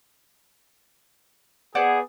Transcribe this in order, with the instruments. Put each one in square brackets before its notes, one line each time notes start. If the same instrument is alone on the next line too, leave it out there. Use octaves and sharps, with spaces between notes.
[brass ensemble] B3 G#4 [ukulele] C5 D5 F#5